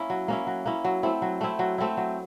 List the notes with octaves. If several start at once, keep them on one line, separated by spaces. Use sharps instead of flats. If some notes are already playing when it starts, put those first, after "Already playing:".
Already playing: A#3 C#4 E4
F#3
A#3 C#4 E4
F#3
A#3 C#4 E4
F#3
A3 C4 E4
F#3
A3 C4 E4
F#3
A3 C4 E4
F#3